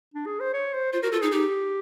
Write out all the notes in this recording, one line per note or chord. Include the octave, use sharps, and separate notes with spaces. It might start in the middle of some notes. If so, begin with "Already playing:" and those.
D4
G#4
C5
C#5
C5
F4 C5
F#4 A#4
F4 A4
D#4 G#4
D#4 G4